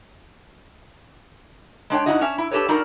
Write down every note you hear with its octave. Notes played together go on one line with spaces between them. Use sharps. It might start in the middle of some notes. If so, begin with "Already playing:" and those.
G#3 D4 C#5 G5
G2 D3 D#4 E4 F#4 D#5
C#4 D4 E5
E4
D4 G4 A4 B4 C#5
G3 D4 D#4 F#4 A#4 D5